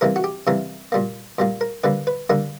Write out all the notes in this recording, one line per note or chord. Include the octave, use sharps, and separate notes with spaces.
C3 E3 G3 A#3 A#4
F#4
G4
C3 E3 G3 A#3 A#4
A#2 G3 A#3
A#2 G3 A#3
A#4
D3 G3 A#3 B4
B4
D3 G3 A#3 A#4